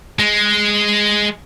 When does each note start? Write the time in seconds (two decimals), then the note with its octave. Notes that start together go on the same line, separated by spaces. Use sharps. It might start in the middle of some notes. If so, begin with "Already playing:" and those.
0.19 G#3